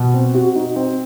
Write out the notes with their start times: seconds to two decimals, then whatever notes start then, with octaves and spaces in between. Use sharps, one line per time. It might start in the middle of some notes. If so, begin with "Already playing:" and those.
Already playing: B2
0.14 C4
0.34 F#4
0.56 D#4
0.76 C4